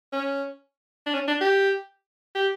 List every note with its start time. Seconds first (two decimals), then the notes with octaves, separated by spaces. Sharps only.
0.13 C#4
1.06 D4
1.14 C#4
1.28 D4
1.41 G4
2.35 G4